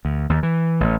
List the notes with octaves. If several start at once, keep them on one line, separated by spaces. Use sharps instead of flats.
D2
D#2
E3
A1